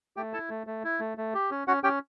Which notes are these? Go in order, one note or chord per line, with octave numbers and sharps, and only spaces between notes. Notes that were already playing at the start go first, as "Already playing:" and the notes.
A3 G4 G5
E4 A4 A5
A3
A3
E4
A3
A3
G4
C#4
C#4 F#4 F#5
C#4 G4 G5